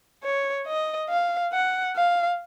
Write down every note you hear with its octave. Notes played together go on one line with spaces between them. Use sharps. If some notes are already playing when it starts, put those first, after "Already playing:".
C#5
D#5
F5
F#5
F5